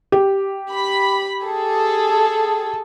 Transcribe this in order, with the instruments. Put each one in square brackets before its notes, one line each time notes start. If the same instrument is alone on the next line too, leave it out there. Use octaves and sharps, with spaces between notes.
[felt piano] G4
[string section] B5
G#4 A4